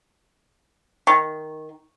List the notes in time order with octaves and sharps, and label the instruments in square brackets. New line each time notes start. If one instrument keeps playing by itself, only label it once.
[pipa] D#3